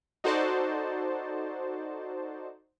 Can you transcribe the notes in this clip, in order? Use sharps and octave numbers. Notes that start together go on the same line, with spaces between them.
D#4 F#4 A4 C5 D5 A5